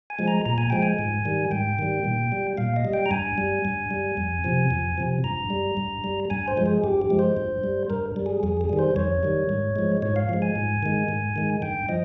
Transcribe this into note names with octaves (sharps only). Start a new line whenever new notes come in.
G#5
F3 G#3
A#5
A#2 A#5
G#5
F3 G#3 G5
G#5
G#2
D#3 G3
G#2 G5
D#3 G3
A#2
G3
A#2 F5
D#5
G3
G5
A#5
G2 G#5
G3
G2
G3
F2
C3 F3
F2
C3 F3
G2 A#5
G3
G2
G3
G2 G#5
C5
F3 G#3
G#4
G2 G4
G4
F3 G#3
C5
G2
G3
G2 A#4
G3
G#4
F2 G#4
G#4
D#3 G3
C5
F2 C#5
D#3 G3
G#2
F3 G#3
G#2 C#5
F5
F3 G#3
G#5
G#2
D#3 G#3
G#2
D#3 G#3
G2 G5
F3 D#5